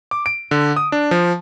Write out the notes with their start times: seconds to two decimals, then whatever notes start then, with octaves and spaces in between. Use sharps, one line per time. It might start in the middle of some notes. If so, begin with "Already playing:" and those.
0.11 D6
0.26 D7
0.51 D3
0.76 D#6
0.92 D4
1.11 F3